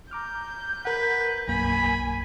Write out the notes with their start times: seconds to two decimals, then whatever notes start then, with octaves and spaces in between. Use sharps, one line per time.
0.11 A#5 D6 F6 G6
0.85 A#4 B4 F#5
1.48 B1 F#2 A#3 G#5 B5